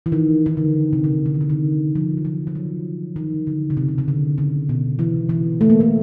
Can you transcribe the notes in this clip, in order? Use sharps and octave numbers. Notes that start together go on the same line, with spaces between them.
E3
D#3
D#3
D3
C3
C#3
D3
D#3
D3
D#3
E3
F3
F#3
F3
F3
F#3
D#3
D3
C#3
C3
C3
C#3
D3
C#3
B2
E3
E3
A3
A#3
A3